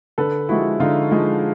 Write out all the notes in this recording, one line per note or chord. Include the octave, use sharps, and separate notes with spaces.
D3 A4 B4
F3 G#3 E4 F#4
D3 D#4 F4
F3 G#3